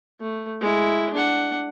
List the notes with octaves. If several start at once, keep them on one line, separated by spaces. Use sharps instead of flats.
A3
G#3 E4
D4 F#5